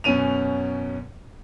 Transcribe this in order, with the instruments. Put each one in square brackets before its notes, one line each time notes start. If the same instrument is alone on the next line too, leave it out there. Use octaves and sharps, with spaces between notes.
[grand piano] F#2 B2 C#4 D#7 F7